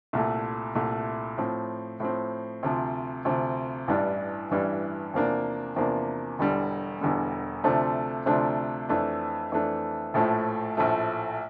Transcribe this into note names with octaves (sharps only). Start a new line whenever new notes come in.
C2 A#2 A3
C2 A#2 A3
A2 F3 C4
A2 F3 C4
D2 C3 F3
D2 C3 F3
A1 G2 E3 G3 D4
A1 G2 E3 G3 D4
E2 C3 F3 A#3 D4
E2 C3 F3 A#3 D4
E1 E2 D3 G3
E1 E2 D3 G3
D2 C3 F3 A3 D4
D2 C3 F3 A3 D4
F2 E3 A3 D4
F2 E3 A3 D4
A#1 A2 F3 A3
A#1 A2 F3 A3